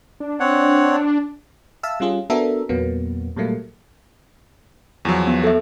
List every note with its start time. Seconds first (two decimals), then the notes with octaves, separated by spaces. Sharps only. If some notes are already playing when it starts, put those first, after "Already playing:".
0.20 D4
0.40 C4 C#5 F#5
1.83 E5 F5 A5 E6
2.00 G3 C#4 F4 G#4
2.30 B3 D4 F#4 A4 A#4 E5
2.69 E2 A#2 F#3 A#3 B3
3.36 A#2 F#3 G3 A3 A#3
5.05 E2 F3 F#3
5.27 B3
5.44 A4 E5